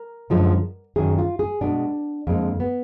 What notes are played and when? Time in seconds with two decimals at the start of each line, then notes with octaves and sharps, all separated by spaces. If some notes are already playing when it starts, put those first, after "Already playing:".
Already playing: A#4
0.30 F#2 D3 F3 G#3
0.96 F#2 D#3 F#3 G#4
1.18 F4
1.39 G#4
1.61 B2 G#3 D4
2.27 F2 D3 G#3 A#3
2.60 B3